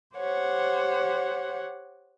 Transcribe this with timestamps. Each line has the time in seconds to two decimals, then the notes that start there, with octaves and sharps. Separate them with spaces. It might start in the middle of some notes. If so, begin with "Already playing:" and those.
0.16 G4 C5 C#5 F#5